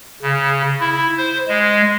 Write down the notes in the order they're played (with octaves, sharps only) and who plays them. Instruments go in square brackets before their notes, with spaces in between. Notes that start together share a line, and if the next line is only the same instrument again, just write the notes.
[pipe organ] C#3
E4
C5
G#3